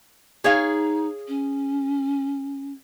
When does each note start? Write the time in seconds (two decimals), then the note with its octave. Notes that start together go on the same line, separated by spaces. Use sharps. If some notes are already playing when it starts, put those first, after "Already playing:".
0.44 D#4 G#4 C#5 F5
1.28 C#4